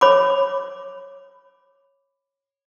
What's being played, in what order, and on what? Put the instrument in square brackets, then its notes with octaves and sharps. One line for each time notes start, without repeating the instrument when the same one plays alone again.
[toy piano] C#5 B5 D6